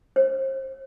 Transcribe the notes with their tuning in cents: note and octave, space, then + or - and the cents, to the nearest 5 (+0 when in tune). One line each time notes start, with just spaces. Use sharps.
C5 +35